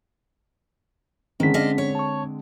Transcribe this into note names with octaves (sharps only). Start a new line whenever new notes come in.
D3 D#3 G#3 C4 C#4 B6
D4 D#5 F5
C#5
A5 C#6